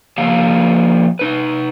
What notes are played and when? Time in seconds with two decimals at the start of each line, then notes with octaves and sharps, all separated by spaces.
0.18 F3 A#3 G4 F5
1.19 D#4 B4